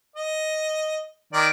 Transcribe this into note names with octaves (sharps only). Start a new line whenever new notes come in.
D#5
D#3 D5